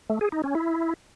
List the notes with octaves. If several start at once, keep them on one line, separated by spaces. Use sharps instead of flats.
A3
G#4
D#4
C#4
E4